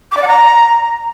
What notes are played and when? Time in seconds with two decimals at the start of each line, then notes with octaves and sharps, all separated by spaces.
0.12 D6
0.17 D5
0.22 F#5
0.27 A#5